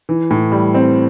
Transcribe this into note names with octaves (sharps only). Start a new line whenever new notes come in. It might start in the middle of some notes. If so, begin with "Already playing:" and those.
E3
A2
G3
C4